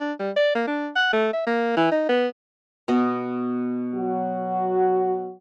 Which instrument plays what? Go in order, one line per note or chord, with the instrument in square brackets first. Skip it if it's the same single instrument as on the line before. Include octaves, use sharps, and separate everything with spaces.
[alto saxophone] D4
G3
D5
A#3
D4
F#5
A3
E5
A#3
E3
D#4
B3
[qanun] B2 B3 D#5
[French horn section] F#3 F#4